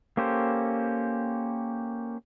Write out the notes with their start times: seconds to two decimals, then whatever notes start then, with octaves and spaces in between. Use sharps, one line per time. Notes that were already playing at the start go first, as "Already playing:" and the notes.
0.17 A#3 C#4 G4 A4 C5